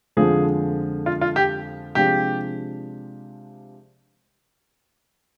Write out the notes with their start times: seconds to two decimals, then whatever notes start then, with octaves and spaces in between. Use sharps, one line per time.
0.17 F2 D3 F3 G#3 G#4
1.06 F4
1.21 F4
1.36 G4
1.95 C3 F3 G#3 D4 F4 G4